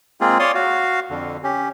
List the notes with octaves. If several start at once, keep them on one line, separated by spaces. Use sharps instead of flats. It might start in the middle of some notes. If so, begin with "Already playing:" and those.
G#3 A#3 C4 F4 G#4
C#5 D5 F5 C6 D#6
F#4 F5
F2 D3
C#4 G4